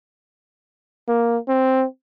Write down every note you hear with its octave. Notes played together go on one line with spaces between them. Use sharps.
A#3
C4